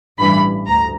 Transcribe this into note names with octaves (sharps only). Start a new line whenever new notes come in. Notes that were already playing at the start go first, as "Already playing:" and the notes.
A1 G2 E3 B5
D2 A#5